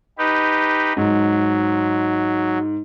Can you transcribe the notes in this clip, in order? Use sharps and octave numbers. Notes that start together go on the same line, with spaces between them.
D#4 G4 B4
G#2 F#3